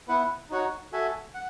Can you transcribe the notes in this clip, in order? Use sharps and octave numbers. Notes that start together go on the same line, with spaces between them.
B3 E4 B4 F#5
D#4 F#4 C#5 F#5
F#4 A4 E5 G#5
F#5